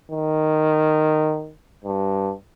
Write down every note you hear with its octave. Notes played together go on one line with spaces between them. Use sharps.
D#3
G2